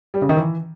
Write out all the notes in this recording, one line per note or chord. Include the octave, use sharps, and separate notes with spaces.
G3
C#3
D#3
E3